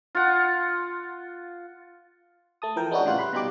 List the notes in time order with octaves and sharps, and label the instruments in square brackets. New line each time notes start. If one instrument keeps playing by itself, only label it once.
[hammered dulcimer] F4 F#5
[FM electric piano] A3 A5 D#6
E3 F3 A#4 G5
G#3 B3 C#4 D4 E4 F#4
A2 C#3 G3 F4 F#5 F#6
B5 C6 F#6
B2 G3 D#4 G4 D6